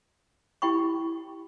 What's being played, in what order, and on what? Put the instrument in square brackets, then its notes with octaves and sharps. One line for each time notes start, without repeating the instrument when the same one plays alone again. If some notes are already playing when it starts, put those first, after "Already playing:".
[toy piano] E4 G4 G5 B5 C#6